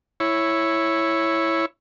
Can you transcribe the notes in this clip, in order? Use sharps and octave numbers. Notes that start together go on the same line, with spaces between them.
E4 C#5